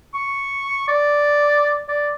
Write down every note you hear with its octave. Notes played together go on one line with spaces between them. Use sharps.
C#6
D5
D5